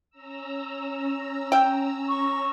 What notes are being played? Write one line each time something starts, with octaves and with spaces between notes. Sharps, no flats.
C#4 A#5 E6
E5 G5
C#6